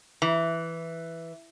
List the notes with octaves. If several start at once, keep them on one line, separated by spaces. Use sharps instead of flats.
E3